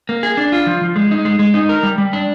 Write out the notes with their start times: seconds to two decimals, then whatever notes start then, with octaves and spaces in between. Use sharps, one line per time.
0.09 A#3
0.23 G#4
0.37 D4
0.52 F4
0.67 F3
0.81 F3
0.96 G#3
1.11 D#4
1.25 G#3
1.39 G#3
1.54 D#4
1.69 A#4
1.83 G3
1.98 G3
2.13 D4